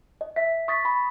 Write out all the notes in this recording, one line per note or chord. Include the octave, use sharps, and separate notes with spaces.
D#5
E5 B6
C#6 D#6 A6 B6
B5